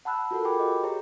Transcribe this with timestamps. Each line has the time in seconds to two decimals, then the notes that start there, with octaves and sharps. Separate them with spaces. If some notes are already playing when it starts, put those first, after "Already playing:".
0.05 F#5 A5 B5 E6 F#6
0.31 F4 F#4 A4 A#4 F#5
0.45 G#4 A#4 G5 G#5 B5 D6
0.59 F#4 D#5
0.83 G4 G#4 C#5 A#5